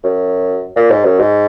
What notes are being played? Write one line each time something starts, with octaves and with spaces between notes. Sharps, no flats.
F#2
A#2
G#2
F#2
G#2